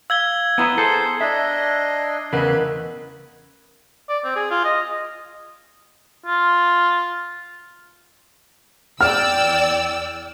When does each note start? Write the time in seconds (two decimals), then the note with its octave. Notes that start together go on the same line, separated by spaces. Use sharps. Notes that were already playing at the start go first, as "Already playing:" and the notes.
0.10 F5 E6 G#6 G7
0.58 B3 E4 B4 F#5 A#5 D#6
0.78 G#4 A4 C5 C7
1.21 D4 D#5 E5
2.33 E2 C#3 A#4 B4 D#5 F#5 B5
4.09 D5
4.24 C4
4.36 G#4
4.51 F4
4.64 D#5
6.26 F4
9.01 E2 D5 G5 E6 F6